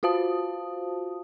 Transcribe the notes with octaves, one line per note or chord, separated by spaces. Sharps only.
F4 F#4 C5 F5 A5 D#6